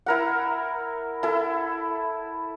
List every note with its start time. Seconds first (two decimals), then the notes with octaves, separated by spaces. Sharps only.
0.06 E4 A#4 F#5
1.23 E4 A4